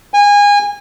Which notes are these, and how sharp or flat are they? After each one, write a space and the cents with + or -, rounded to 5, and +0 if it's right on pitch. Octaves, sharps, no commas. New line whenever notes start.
G#5 -25